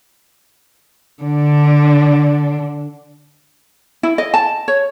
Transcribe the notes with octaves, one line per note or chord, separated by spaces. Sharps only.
D3 D4
E4
D#5
A5
C#5